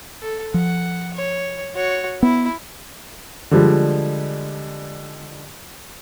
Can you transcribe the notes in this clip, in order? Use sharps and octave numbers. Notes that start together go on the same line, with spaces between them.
A4
F3 F#5
C#5
F#4 C#5
B3 E4
D3 F3 G3 G#3